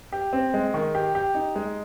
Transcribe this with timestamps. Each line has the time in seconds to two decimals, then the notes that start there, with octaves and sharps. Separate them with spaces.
0.12 G4
0.33 C4
0.54 G#3
0.74 D#3
0.95 G4
1.15 G4
1.35 D#4
1.55 G#3